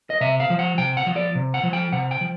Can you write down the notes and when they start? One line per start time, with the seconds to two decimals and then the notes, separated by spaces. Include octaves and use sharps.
0.10 D#5
0.21 C3 E5
0.40 F5
0.50 F3
0.59 F#5
0.78 C3 G5
0.97 F#5
1.06 F3
1.16 D5
1.35 C3
1.54 F#5
1.63 F3
1.73 G5
1.92 C3 F#5
2.11 G5
2.21 F3